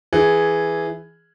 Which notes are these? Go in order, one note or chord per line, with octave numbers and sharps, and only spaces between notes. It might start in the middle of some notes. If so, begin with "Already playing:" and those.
E3 G#4